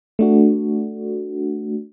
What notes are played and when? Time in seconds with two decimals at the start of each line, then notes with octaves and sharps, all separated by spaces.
0.19 A3 D4 F#4